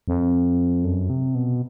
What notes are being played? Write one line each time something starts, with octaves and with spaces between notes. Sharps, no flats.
F2
F#2
C3
B2